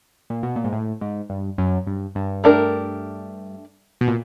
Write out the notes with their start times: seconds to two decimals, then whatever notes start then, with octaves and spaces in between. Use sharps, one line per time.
0.30 A#2
0.43 B2
0.56 A#2
0.64 G#2
0.73 A2
1.01 G#2
1.30 G2
1.58 F#2
1.87 G2
2.15 G2
2.44 A3 D4 G4 A#4
4.01 B2
4.08 A#2